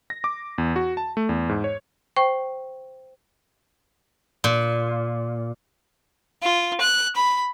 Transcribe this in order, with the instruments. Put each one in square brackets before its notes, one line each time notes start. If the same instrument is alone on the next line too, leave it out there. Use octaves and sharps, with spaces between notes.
[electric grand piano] A#6
D6
E2
F#4
A5
A3
E2
G#2
C#5
[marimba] C5 G5 C#6
[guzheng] A#2
[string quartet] F4
F#6
B5